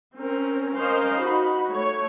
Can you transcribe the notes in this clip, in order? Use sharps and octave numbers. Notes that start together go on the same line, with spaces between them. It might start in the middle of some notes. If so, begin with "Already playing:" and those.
C4 C#4 A#4
C#4 A#4 C5 D#5 F5 C6
D#4 F#4 B5
A3 C#5